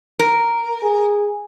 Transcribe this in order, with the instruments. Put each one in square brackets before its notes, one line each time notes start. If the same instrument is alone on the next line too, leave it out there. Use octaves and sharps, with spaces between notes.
[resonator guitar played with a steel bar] A#4
[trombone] G#4